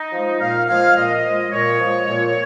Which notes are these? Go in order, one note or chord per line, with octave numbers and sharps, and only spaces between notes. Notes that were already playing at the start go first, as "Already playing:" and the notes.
Already playing: D#4
F3 G#3
A#2 F5
F3 G#3 F5
A#2 D#5
F3 G#3
A#2 C#5
F3 G#3
A#2